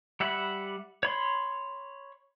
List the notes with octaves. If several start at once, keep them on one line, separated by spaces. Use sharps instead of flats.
G3 E5 F#5 B5
C#5 B5 C6